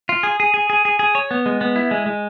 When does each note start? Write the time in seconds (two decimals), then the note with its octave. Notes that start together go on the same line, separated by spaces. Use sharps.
0.09 F4
0.23 G#4
0.40 G#4
0.54 G#4
0.70 G#4
0.85 G#4
0.99 G#4
1.15 C#5
1.31 B3
1.46 G#3
1.61 B3
1.76 E4
1.91 G#3
2.06 G#3